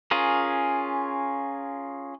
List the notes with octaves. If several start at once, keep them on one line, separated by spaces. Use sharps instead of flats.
C#4 F4 G#4 A#4